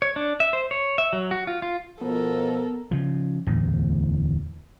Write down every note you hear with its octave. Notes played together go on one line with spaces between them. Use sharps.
C#5
D4
E5
C5
C#5
E5
F#3
F#4
F4
F4
B2 F3 B3 A4 A#4
C#3 F3
D1 E2 A2